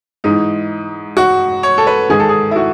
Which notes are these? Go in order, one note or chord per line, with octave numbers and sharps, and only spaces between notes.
G#2 E3 D#4
F#4
C#5
A4
B4
G#2 D#3 G#4
A4
G#4
E4
F#4